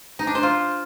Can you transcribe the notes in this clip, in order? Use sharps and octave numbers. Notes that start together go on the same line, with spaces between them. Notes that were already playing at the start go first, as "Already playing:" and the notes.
D#4
D4
C5
F4